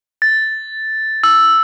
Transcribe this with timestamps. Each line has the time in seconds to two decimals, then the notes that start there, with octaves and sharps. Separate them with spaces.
0.22 A6
1.23 E6